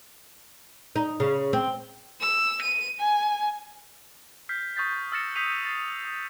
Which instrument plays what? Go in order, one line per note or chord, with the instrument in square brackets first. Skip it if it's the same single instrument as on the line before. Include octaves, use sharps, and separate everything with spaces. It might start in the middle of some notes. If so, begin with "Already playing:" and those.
[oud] D#4
C#3
C4
[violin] E6
D#7
G#5
[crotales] F6 G6 B6 C7
C#6 D#6 G6 A6 B6
E6 F6 A6 A#6 C#7 E7
D#6 G6 B6 C7 D#7 F7
A6 C7
D#6